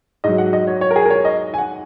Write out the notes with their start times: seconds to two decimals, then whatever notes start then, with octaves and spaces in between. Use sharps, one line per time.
0.24 G#2 F#3 D#5
0.38 F#5
0.53 D#5
0.67 C#5
0.81 C#5
0.91 A#4
0.96 G#4
1.05 A#4
1.10 C#5
1.25 D#5
1.54 G#5
1.58 F#5